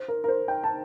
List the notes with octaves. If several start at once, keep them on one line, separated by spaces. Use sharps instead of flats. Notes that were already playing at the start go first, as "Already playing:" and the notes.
Already playing: C5
A#4
A#4
C5
G5
A5